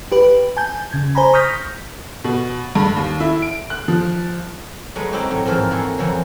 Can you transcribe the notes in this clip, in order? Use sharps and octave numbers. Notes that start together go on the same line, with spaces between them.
G4 B4
G#5 A5 G6
C#3 G#6
C5 G#5 A#5 B5
C#6 D#6 F6 G6 A#6 B6
B2
G2
D#2
E4
D7
F#6
F3
F#3 G#3 A3 G#4 B4 D#5
C4 D#4 E4 F#4 G4 C5
A2 F#3 A3
G#2 E3 F3 A#4 C5 A5
A#3 E4 F#4 G#4 A4
F2 E3 F#3 C5